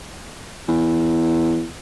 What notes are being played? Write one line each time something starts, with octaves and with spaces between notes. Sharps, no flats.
E2